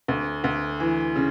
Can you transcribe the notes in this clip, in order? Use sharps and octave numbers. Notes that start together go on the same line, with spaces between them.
D2
D2
E3
C#3